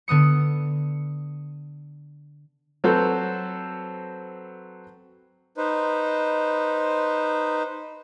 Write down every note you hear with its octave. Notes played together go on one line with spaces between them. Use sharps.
D3 B3 D#6 C#7
F#3 C4 F#4 A4 B4 C5
D#4 B4 C5